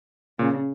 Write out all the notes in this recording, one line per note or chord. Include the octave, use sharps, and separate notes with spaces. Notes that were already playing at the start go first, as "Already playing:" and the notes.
A#2 C#3